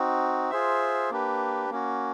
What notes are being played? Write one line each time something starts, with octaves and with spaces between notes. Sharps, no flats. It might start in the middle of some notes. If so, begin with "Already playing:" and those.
Already playing: C4 D#4 F#4
F4 G#4 C5 E5
A#3 D4 G4 B4
A#3 C#4 F#4